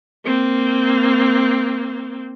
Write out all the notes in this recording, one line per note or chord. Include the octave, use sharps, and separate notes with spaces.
A#3 C4